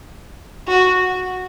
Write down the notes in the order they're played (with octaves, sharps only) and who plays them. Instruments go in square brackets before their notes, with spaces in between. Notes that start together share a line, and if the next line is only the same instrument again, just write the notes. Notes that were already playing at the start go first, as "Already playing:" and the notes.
[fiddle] F#4